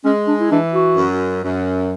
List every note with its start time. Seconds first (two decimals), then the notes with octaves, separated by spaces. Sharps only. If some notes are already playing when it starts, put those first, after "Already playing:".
0.04 G#3 C#4
0.27 D4
0.40 E4
0.50 E3 D4
0.73 F#4
0.96 F#2
1.43 F#2